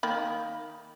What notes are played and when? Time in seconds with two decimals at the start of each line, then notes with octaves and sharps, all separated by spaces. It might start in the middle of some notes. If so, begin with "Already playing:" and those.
0.03 D#3 A#3 B5